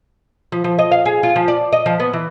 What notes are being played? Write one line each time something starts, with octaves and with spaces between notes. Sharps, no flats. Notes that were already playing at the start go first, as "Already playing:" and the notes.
F3
F3
D#5
F5
G#4
F4
F3
D5
D#5
F3
B3
E3